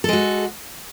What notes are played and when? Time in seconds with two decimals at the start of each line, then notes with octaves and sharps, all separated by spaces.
0.04 A4
0.09 G#3
0.13 F#4